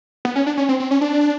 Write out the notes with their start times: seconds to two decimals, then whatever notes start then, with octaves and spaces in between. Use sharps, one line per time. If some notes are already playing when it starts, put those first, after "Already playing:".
0.25 B3
0.36 C#4
0.46 D4
0.57 C#4
0.69 C4
0.80 C4
0.91 C#4
1.01 D4